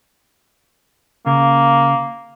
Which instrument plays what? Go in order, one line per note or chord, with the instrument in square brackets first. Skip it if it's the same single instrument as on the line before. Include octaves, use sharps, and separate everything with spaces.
[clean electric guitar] C#3 [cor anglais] A#3